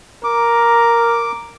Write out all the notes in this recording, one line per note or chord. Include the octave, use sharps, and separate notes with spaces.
A#4 D6